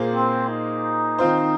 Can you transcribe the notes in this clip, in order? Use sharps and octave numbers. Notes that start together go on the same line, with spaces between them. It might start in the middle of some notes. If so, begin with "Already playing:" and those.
Already playing: A#2 A#3 G#4 C5
C4
D#4
D#3 C4 F4 C5